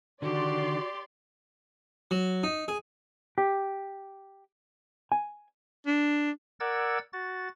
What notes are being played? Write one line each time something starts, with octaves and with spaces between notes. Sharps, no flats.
D3 D#3 F#4 G4 D5 C6
F#3
D#4
G#4
G4
G#5
D4
A#4 D5 F#5 E6 G#6 A6
F#4 A6